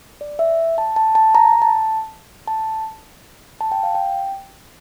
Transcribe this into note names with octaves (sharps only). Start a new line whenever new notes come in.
D5
E5
A5
A5
A5
A#5
A5
A5
A5
G5
F5
G5